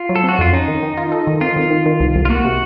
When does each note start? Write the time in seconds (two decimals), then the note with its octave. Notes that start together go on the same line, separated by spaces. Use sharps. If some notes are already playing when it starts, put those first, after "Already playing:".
Already playing: F4
0.09 F#3
0.16 A4
0.24 C4 F#4
0.39 F2 F4
0.53 C#4 D#4
0.68 D#3
0.83 D#3
0.97 F4
1.12 A4
1.27 D#3
1.41 C4 F4
1.56 D#3
1.71 D#3
1.86 D#3
2.00 C2
2.15 C2
2.25 F4
2.30 A#3 F#4
2.44 C3